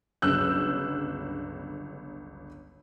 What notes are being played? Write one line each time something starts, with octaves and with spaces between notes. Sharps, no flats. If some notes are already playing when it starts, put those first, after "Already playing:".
G1 C#2 F#3 E6 F#6 G6